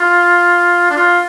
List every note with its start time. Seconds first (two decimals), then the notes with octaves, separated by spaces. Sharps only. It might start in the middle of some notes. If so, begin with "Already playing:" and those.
Already playing: F4
0.91 D4
0.97 F4